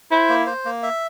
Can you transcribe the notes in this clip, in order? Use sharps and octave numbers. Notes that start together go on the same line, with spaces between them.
E4 C5
A#3
C5
A#3
E5